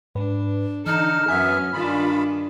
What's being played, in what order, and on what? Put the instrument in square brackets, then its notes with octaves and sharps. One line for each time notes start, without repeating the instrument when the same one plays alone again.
[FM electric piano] G#2 B4 [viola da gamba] D4
[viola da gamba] D3 A4 [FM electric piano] E3 C#7 [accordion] D#4 [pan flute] F6
[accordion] F#2 B3 E5 [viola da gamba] F#3 C#4 [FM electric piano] G#5 D#6
[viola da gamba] G2 D#3 D4 [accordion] F4 B5